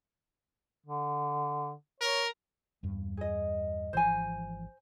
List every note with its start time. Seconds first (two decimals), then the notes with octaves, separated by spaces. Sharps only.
0.86 D3
2.00 A#4 C#5
2.83 E2 G2 G3
3.17 G#4 D#5
3.93 G#1 E3 F3 C5 G#5